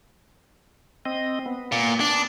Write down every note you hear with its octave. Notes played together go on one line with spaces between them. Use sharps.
C4 D#5
B3
A#2
D4